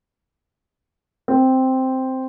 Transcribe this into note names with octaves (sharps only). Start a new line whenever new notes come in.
C4